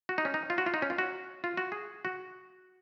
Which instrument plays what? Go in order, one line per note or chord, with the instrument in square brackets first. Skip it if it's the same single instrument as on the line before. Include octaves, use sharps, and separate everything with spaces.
[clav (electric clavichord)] F#4
D#4
C#4
D#4
F4
F#4
F4
D#4
C#4
F4
F#4
F4
F#4
G#4
F#4